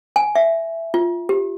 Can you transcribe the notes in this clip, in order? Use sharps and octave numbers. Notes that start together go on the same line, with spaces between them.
G#5
E5
F4
G4